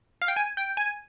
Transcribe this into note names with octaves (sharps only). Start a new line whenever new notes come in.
F5
G5
G#5
G5
G#5